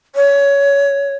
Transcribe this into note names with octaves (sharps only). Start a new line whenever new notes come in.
C#5